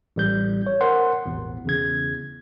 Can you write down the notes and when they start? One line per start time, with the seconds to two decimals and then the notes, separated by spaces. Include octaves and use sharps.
0.16 A1 G3 G6
0.67 C#5
0.81 A#4 C5 F#5 C6
1.26 A1 E2 B2
1.66 E2 C#3 G#6